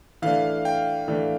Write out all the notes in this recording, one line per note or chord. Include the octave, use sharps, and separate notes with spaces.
E3 A3 D4 F5
G5
E3 A3 D4